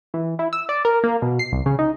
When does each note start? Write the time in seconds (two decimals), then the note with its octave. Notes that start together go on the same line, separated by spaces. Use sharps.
0.14 E3
0.39 E4
0.53 E6
0.69 D5
0.85 A#4
1.04 A#3
1.22 B2
1.39 C7
1.52 C2
1.66 C#3
1.79 D#4